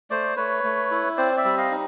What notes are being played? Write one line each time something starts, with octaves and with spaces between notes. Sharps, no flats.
A3 C5 D5
A3 B4 C#5
A3
E4
C4 C5 D5
D5 E5
G3
D#5 F5
D#4